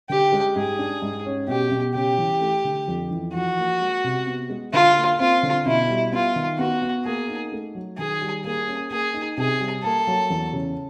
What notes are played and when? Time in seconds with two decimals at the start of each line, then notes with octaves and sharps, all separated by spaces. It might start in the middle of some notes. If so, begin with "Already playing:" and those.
0.09 D3 G4
0.32 G#3
0.56 G#2 G#4
0.79 D4
1.02 G#2
1.26 C#4
1.48 B2 G4
1.71 B2
1.95 C#3 G4
2.18 E3
2.41 A3
2.65 D3
2.88 F2
3.11 E3
3.34 F3 F#4
3.57 A#3
3.80 G#3
4.04 C3
4.27 B3
4.50 G#3
4.73 D3 F4
4.96 A#3
5.19 C4 F4
5.43 D3
5.66 B2 E4
5.89 G3
6.12 B3 F4
6.36 D#3
6.58 B3 F#4
6.82 B3
7.05 A#3 G#4
7.28 D#4
7.52 A3
7.75 F#3
7.98 D#3 G#4
8.21 G3
8.44 A#3 G#4
8.68 C#4
8.91 A#3 G#4
9.14 D#4
9.37 C3 G#4
9.60 G3
9.83 A#3 A4
10.07 F#3
10.30 E2
10.53 C#3